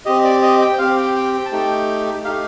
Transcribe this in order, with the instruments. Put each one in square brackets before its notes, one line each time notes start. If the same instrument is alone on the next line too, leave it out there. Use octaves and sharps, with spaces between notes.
[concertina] C4 G4 D#5
D5
D#5
G5
C4 G4 F5
G5
G5
G5
A5
A3 D#4 G4 G5
A3 D#4 G4 F5